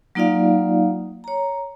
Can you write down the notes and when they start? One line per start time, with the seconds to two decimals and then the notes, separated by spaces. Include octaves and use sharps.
0.15 F#3 A#3 D#4 F4 D5 F5
1.24 C#5 A#5